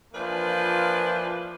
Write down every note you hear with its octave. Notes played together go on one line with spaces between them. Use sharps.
E3 F3 A#3 D4 F4 B4